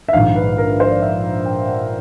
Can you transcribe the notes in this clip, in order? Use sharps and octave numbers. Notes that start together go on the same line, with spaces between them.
E5
A#1 G#2 D#3 F5
B4
A#4
B4
C5
D5
E5
F5
G5
F#5